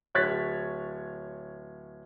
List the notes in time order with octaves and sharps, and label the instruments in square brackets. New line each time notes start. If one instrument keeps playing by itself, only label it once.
[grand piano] D1 C#5 F#6 A6 B6